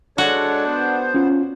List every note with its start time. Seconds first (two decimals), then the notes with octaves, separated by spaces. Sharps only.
0.18 G#3 D4 F#4 A4 C#5
0.64 B3 C5
1.15 C#4 F4